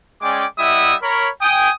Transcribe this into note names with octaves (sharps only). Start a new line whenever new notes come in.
G#3 C#4 D5 G5 D6
G3 E4 D#5 E5 F#5 D#6
A#4 C#5 B5
G5 G#5 D#6